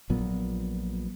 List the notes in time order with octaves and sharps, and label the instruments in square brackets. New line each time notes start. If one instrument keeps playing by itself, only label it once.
[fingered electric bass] A#1 A#2 F#3 B3